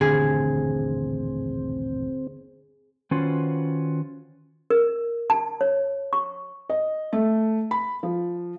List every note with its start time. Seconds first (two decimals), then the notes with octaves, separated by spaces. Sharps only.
0.01 D#1 A1 G2 D3 C4 G#4
3.11 D#3 C#4 F4 F#4 B4 C5
4.70 A#4
5.30 A5
5.61 C#5
6.13 C#6
6.70 D#5
7.13 A3
7.71 B5
8.03 F3